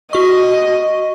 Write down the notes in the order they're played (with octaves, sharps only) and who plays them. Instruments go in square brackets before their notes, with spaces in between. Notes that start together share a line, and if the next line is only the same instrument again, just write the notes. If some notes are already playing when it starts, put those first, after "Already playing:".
[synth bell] F#4 C#6 [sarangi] D#5